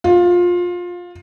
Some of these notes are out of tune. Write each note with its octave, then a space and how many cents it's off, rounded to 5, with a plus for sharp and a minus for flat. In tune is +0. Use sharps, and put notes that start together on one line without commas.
F4 +20